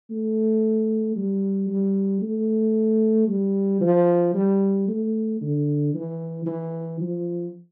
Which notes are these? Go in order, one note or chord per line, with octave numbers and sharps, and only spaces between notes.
A3
G3
G3
A3
G3
F3
G3
A3
D3
E3
E3
F3